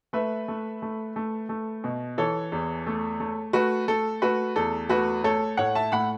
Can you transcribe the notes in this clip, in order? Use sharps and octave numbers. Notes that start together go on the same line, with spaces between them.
A3 B4 E5
A3
A3
A3
A3
B2
E3 A4 C#5
E2
A3
A3
A3 F#4 B4
A3 A4
A3 F#4 B4
E2 A4
A3 F#4 B4
A3 A4 C#5
A2 C#5 F#5
E5 A5
A2 F#5 B5